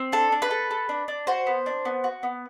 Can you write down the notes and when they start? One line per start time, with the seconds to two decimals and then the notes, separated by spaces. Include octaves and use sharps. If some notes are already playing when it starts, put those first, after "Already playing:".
Already playing: C4
0.12 D4 A4
0.32 D4
0.42 B4
0.51 A4
0.71 A4
0.89 D4
1.08 D4
1.27 F#4 C5
1.47 B3
1.66 D4
1.85 B3
2.04 F#4
2.23 B3